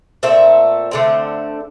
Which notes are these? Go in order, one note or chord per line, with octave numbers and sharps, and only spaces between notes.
A#2 A3 C4 E5
D3 A3 C4